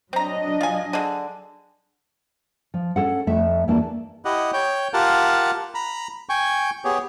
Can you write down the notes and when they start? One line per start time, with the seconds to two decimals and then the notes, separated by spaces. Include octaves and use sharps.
0.13 F#3 C4 D4 D#5 A#5
0.61 F4 G#5
0.93 D3 G#4
2.74 F3
2.96 C#4 A4 F#5
3.27 F2 A3 E5
3.68 E2 E3 A#3 D4 A5
4.25 E4 G4 D#5 F#5
4.53 C#5 G5
4.94 F4 G4 A#4 F#5 A5
5.75 A#5 B5
6.29 G5 G#5 C#6
6.84 B3 G4 G#4 C#5